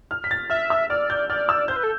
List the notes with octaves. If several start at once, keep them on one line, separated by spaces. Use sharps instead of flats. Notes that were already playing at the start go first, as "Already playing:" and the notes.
F6
B6
A6
E5 F6
E6
D5 F6
G6
D5 F6
E6
C5 G6
B4
A4